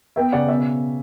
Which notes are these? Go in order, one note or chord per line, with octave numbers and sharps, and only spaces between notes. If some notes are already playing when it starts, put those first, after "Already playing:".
B3 E5 G5
C#3 D5 F#5
B2 E5